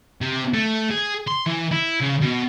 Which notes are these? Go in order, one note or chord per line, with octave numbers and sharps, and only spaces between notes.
C3
A3
G#4
C6
E3
E4
C#3
B2